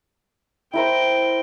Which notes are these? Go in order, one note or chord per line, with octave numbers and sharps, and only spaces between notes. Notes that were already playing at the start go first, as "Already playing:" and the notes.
E4 A#4 C5 G5